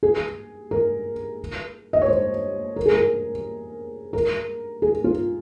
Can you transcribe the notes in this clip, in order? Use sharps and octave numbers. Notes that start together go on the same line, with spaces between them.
G#4
A#4
D#5
C#5
C5
A#4
G#4
A#4
A#4
G#4
F4